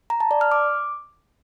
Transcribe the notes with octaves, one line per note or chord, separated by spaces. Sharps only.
A#5
A5
D5
F6
D6